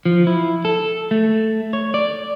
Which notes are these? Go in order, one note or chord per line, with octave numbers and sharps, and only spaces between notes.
F3
E4
A4
A3
C#5
D5